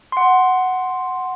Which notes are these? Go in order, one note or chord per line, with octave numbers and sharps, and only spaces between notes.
F#5 C6